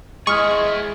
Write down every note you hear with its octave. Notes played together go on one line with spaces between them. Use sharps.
G#3 E4 G#4 C#6 D#6 F6